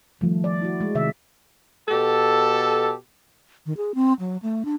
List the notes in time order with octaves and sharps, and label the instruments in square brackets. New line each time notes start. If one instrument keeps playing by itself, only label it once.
[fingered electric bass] D#3 F3 G3 [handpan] A3
[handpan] D5
E4 F#4
G#3
C3 D#3 E5
[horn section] B2 G4 A4
[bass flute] D#3
G#4
C4
F#3
A3
D4